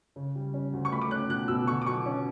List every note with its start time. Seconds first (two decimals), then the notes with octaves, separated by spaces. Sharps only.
0.16 C#3
0.35 G3
0.54 C#4
0.73 D2
0.85 C#6
0.92 A3 B5
1.02 D6
1.11 C#4 F#6
1.29 B2 F#6
1.48 B2 E6
1.67 D3 C#6
1.82 D6
1.86 F#3 C#6
2.06 C#4